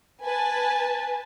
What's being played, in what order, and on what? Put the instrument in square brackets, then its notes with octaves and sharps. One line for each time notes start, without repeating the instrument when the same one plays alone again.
[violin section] B4 G#5 A5